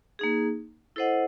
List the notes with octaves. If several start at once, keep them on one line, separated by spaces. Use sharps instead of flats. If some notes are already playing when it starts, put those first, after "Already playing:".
A#3 D#4 G#4
E4 A4 C5 D#5 F#5